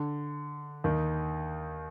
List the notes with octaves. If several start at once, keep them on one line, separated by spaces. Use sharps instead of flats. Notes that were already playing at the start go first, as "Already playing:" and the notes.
Already playing: D3
D#2 D#3